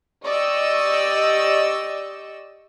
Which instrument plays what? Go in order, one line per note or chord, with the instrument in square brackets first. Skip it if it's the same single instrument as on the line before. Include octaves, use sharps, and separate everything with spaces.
[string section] G4 D5 D#5 C#6 E6